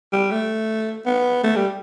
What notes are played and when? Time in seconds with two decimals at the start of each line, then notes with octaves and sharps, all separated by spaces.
0.12 G3
0.31 A3
1.06 B3
1.44 A3
1.56 G3